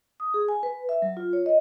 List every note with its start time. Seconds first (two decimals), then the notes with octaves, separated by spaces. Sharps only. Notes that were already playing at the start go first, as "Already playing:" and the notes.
0.20 D#6
0.34 G#4
0.48 G#5
0.63 B4
0.89 E5
1.02 F#3
1.17 F4
1.33 C#5
1.46 D#5